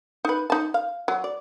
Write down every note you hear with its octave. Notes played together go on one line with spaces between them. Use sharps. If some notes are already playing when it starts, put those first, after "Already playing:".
D#4 B4
D#4 A5
F5
F#3
D5